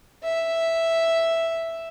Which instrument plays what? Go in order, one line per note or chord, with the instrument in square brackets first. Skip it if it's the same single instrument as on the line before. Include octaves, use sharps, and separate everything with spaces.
[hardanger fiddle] E5